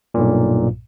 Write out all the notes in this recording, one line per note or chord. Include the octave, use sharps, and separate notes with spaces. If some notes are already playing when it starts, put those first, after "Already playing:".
B1 G2 A#2